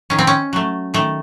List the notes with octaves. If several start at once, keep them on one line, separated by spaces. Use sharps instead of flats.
D#3 C#4
C4
C#4
F#3 A3
D#3 A3